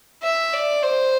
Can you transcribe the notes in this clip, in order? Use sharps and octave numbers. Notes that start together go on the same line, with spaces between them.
E5
D5
C5